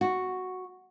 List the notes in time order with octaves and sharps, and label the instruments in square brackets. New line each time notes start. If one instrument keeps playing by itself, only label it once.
[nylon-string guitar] F#4